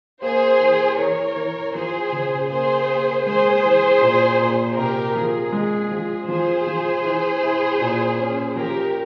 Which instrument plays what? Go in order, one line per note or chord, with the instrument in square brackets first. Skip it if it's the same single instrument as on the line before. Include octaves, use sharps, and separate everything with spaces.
[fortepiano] A#3 [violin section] G#4 C5
[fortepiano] E3
[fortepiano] E3 [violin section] A#4 C#5
[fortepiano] E3
[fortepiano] F3 [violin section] G#4 C5
[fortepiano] C#3
[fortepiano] A#3 [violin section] G#4 C5
[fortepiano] A#3
[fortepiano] G#3 [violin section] G#4 C5
[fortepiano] E3
A#2
A#2
[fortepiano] C3 [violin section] G4 A#4
[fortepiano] F3 [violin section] G#4
[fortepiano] G#3
F3
[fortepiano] F3 [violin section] G#4 C5
[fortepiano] F3
E3
E4
A#2
C#4
[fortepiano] F3 [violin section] G4 A#4